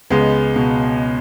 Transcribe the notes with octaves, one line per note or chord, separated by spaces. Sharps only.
C#2 G#3 B3
B2